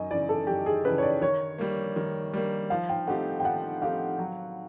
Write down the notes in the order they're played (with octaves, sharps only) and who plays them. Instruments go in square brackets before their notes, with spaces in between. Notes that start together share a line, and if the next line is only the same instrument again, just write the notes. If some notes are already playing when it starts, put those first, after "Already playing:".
Already playing: [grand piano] F#2 [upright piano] D#5
[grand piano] C#3 E3 [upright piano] D5
[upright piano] A4
[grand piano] F#2 [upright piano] G4
[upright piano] G#4
[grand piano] C#3 E3 [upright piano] B4
[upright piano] C#5
D5
[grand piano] D#3 [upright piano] C#5
[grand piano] G3 A#3
D#3
G3 A#3
[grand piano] F3 [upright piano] F5
[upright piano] G5
[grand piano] A3 C4 D#4 G4 [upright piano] F#5
[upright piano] G5
[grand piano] F3 [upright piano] F#5
[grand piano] A3 C4 D#4 G4 [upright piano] F5
[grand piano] F#3